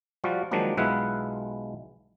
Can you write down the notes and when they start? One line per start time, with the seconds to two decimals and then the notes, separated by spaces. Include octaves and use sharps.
0.24 F3 G3 F4 F#4
0.51 D#3 F3 F#3 G#3 A#3 D4
0.77 B1 G#3 E4 F4 B4 F#5